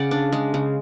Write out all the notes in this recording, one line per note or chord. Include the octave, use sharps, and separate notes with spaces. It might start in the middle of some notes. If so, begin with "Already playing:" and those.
Already playing: C#3 D5 F#5
D4
G#3
C#3